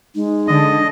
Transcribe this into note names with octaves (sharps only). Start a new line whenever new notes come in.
G#3 D#4
D3 D#5